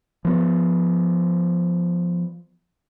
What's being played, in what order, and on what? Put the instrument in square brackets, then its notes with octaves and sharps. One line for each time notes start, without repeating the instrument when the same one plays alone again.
[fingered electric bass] F3 B3